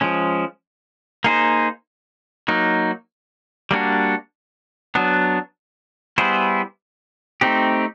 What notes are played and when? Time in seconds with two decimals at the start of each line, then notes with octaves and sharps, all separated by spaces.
0.01 F3 G#3 C#4
1.24 A#3 D#4 G#4 C5
2.48 F#3 A#3 D#4
3.71 G3 A#3 D4 F#4
4.95 F#3 B3 D4
6.18 G3 B3 E4 G#4 C5
7.41 A3 C4 D#4 G4